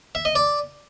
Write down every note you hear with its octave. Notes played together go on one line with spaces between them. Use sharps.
E5
D#5
D5